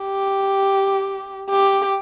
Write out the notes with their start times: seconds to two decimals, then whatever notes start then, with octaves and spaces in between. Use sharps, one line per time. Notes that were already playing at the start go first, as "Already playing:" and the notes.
Already playing: G4
1.49 G4